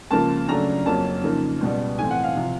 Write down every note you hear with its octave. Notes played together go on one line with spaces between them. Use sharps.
C#2 C#3 F3 A#3 A5
C#3 F#3 A3 D4 A#5
F2 C#3 F#3 A#3 C#4 A5
C#3 F3 A#3 D#4
C#2 B2 G3
A2 E3 A3 C4 G#5
F#5
F5
C3 F3